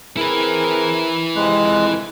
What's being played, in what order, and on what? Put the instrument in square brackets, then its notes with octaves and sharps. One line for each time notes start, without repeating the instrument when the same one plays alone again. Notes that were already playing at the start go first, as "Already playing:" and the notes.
[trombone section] C4 G#4 A#4 [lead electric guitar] E4 B4
[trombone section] F2 C3 [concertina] G#3 F#6